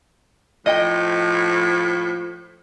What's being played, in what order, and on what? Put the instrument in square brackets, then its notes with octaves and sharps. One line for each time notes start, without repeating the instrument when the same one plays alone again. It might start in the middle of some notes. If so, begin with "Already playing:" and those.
[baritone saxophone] A2 [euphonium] F3 [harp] D#5 G5